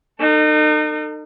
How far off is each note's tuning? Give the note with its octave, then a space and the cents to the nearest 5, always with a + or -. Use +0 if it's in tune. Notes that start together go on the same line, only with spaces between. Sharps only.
D#4 -35 A4 +45